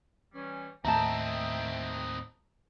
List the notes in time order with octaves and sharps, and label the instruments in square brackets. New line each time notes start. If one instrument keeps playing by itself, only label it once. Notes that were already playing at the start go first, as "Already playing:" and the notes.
[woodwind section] E3 G3 C#4
[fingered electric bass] D#2 A2 [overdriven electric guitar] C4 D#4 [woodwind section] E5 G5 [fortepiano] A5 A#5